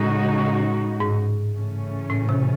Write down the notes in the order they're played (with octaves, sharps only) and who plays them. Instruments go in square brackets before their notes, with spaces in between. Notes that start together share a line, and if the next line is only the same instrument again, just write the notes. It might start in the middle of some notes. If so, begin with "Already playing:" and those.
Already playing: [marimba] A2 [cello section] C#3 G#3 D#4 F#4
[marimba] A2
G#2
[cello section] C#3 E3 A3 C#4
[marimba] A2
C3